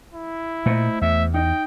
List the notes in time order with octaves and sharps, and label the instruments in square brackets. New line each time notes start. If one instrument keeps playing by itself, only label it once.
[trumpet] E4
[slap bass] A#2 [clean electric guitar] A3 C5 D#5
[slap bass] E2 [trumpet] E5
[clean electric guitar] D#4 D#5 [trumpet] G5